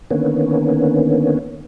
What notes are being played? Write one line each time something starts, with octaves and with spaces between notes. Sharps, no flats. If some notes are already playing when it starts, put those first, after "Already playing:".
D3 D#3 A#3 B3 C#4